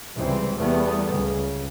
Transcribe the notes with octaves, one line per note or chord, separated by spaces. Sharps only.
C#2 C3 E3 G3 C4
E2 G3 A3 B3
C#2 C#3